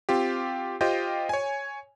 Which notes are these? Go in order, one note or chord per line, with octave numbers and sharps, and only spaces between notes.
C4 F4 G4
F4 G4 C5 D#5 G5
C#5 G#5